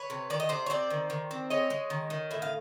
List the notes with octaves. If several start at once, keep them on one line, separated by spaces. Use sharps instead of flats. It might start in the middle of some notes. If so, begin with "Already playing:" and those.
Already playing: B4 C#5
C3
D#3 D5
D#5
C3 C5 D5
C#5
C4 C5 D5
D#3
D#3
C4
G#3 C#5 D#5
G#3
D#3
D#3
A2 E5
F5